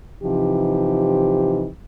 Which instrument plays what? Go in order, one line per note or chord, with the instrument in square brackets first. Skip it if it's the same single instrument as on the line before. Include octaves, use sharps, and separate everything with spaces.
[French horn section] C3 E3 F3 D#4 G4